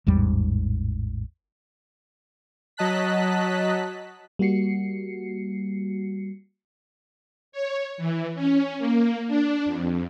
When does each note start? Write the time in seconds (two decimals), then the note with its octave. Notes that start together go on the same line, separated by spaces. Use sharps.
0.07 A1 E2 G#2 G3
2.77 F#3 D#5 A5 F#6 B6
4.39 G3 A#3 F#4 C7 C#7
7.52 C#5
7.98 E3
8.35 C#4
8.78 A#3
9.27 D4
9.66 F2